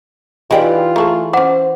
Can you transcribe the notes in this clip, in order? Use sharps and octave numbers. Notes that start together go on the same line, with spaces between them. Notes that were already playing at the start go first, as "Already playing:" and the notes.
E3 D#4 F4 G4 G#4 D5 G5
A3 G#4 A4 A#5 C#6
C#4 E4 C5 F#5 D6